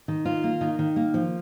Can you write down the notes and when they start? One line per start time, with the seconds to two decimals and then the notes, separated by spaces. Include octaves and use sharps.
0.08 D#3
0.25 F4
0.44 A#3
0.61 D#3
0.79 D#3
0.96 A#3
1.14 F3